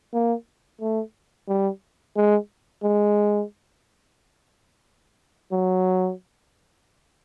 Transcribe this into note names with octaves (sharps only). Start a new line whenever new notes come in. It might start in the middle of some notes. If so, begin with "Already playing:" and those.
A#3
A3
G3
G#3
G#3
F#3